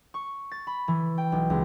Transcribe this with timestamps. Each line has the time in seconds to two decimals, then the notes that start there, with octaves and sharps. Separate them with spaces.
0.14 C#6
0.51 A6
0.67 B5
0.88 E3
1.18 G5
1.32 B1
1.50 C#2